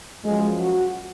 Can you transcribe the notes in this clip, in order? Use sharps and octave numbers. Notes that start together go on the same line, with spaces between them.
F#2 F3 G#3
F#4